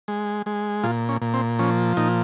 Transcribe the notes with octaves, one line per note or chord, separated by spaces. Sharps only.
G#3
G#3
A#2 F4
C#4
A#2
C4
F3 C#4
A#2 D#4